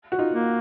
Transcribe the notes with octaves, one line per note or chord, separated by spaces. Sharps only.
F#4
D#4 F4
A#3